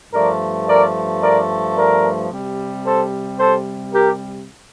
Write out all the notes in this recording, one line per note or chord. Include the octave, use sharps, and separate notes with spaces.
G2 F3 A3 A#4 D5
A#4 D5
A#4 D5
A#4 D5
C3 G3
A4 C5
A4 C5
G4 A#4